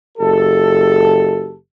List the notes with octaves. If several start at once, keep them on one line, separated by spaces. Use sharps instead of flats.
F#1 G4 A4